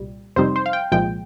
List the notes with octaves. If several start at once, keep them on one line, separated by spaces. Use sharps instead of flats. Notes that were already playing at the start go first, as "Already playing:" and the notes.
Already playing: C2 A#2 G3
F2 C3 G3 C4 D#4 C5
C5
F5
G5
C2 A#2 F3 G#3 G5